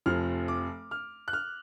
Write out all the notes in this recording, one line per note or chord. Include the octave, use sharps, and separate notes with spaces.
F1 F2 F3 F6
D6
F6
F#6
F6